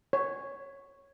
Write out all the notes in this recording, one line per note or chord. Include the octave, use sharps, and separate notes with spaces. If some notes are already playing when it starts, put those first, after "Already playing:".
C#5